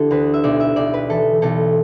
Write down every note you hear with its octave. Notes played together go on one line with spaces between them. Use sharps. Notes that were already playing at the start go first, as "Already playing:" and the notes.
Already playing: D3 E4 G4 A4
D2 B4
E5
B1 D5
E5
B1 D5
B4
E3 A4
B1 A4